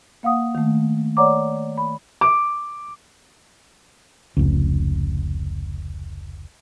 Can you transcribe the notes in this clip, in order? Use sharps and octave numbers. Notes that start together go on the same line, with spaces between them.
A#3 F5 F#5 D#6
D#3 A3
C#5 D5 F#5 A#5 D6
B5
D6
F1 C#2